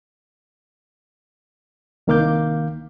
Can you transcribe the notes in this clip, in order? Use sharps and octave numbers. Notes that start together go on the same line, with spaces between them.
C2 D#3 A#3 F5 D6 G6